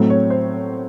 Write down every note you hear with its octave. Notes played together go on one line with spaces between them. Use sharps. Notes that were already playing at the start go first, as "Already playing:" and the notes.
Already playing: A2 F#3 A3 C4
C#5
C5